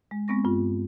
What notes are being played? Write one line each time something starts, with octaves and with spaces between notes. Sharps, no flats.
G#3
G#3 B3 C4 C#6 A#6
G2 F4